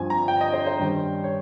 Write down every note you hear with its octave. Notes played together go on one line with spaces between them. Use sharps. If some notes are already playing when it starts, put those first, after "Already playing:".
Already playing: G2 F3 C4 G#5
A#5
G5
D#5
C5
C5
G2 D#3 G3 C#4
C#5